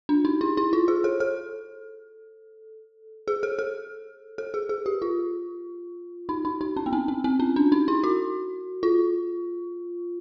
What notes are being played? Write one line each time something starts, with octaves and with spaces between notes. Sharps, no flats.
D4
D#4
E4
E4
F4
G#4
A4
A4
G#4
A4
A4
A4
G#4
G#4
G4
F4
D#4
D#4
D#4
C#4
B3
C4
C4
C4
C#4
D4
D#4
E4
F#4
F4